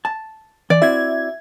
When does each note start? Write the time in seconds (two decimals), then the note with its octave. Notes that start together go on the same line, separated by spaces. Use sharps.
0.05 A5
0.70 E3 D5
0.82 C4 E4 F#4 E5 G#6